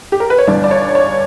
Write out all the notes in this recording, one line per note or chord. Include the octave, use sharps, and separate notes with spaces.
G4
A#4
B4
C#5
G1 G2 E3 D5
D5
C#5
C#5